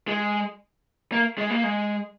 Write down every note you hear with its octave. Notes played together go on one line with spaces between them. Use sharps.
G#3
A#3
G#3
A#3
G#3